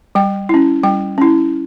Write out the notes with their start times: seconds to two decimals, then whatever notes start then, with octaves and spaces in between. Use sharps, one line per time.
0.15 G3 G5
0.49 C#4 E4
0.83 G3 G5
1.18 C#4 E4